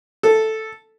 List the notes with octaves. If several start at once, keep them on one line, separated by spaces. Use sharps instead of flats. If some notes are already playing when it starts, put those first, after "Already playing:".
A4